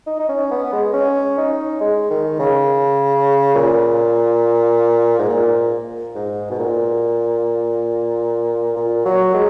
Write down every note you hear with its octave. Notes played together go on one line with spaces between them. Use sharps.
D#4
D#4
C#4
B3
G#3
C#4
D#4
G#3
D#3
C#3
A#2
G#2
A#2
G#2
B2
A#2
A#2
F#3
G#3